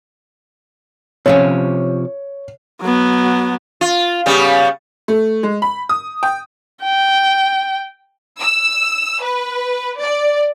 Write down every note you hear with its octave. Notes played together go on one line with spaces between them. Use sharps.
C3 F3 C#4 C#5
F#3 B3
F4
C#3 G3 B3
A3
G#3
B5
D#6
G5
G5
E6
B4
D5